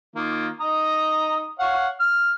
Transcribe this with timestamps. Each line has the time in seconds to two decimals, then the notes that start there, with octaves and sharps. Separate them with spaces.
0.15 D#3 A#3 F4
0.60 D#4 A#5 D#6
1.59 C#5 F5 F#5
2.00 F6